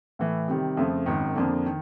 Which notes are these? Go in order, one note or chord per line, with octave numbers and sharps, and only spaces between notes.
A2 E3 A3
C3 D#3 G3
F2 C#3 F3 A3
G#1 F#2 D#3
F2 D3 F3 A#3 D4
D#3